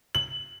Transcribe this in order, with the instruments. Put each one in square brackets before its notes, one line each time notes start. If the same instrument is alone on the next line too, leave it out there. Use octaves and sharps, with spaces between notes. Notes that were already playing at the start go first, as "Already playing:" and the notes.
[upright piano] F#7